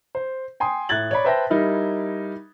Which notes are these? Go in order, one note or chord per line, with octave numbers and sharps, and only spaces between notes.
C5
G5 G#5 C6 D#6
A2 F#6 G#6 A6 F#7
C#5 D5 B5
B4 C5 E5 G5 A5 A#6
G3 D#4 E4 A#4